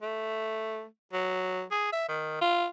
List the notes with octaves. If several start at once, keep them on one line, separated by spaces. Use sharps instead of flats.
A3
F#3
G#4
E5
D#3
F4